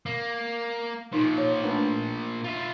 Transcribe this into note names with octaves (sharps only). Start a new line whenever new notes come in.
A#3
A#2 F3 D#4
C#5
A3 D4 B4
F4 E5